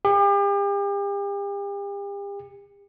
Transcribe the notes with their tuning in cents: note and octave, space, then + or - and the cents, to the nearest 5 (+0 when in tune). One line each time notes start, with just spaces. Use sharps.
G4 +40